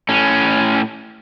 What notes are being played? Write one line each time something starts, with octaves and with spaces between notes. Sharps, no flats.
A2 C#4